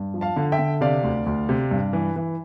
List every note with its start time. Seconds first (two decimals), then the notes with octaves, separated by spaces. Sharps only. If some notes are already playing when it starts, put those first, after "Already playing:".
Already playing: G2
0.14 F3
0.21 F5 A5
0.36 D3
0.52 E5 G5
0.59 D3
0.81 C3 D5 F5
1.04 D2
1.26 D2
1.49 C3
1.71 G2
1.93 E3
2.16 E3